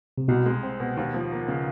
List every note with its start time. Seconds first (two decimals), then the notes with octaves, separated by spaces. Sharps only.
0.18 C3
0.28 C2 B2
0.46 G#3
0.63 C4
0.80 B2
0.97 D#2
1.14 F3
1.32 A#3
1.48 C#3